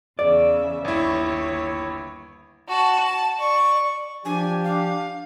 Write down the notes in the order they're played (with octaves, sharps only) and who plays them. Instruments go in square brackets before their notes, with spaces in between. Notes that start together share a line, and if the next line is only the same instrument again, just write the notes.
[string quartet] E2 C#3 E5 [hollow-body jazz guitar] D5
[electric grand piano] G1 E4 [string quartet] D#2 C#5
[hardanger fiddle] F#4 A5
A5
D5 C#6
[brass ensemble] F3 G4 [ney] D4 [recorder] G#5
[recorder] F5